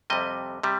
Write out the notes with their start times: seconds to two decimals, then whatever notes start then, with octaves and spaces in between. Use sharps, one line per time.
0.10 F2 C3 G3 D#5
0.63 C3 G3